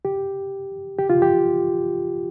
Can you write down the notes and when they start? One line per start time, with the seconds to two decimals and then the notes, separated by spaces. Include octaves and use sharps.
0.05 G4
0.99 G4
1.10 F4
1.22 G4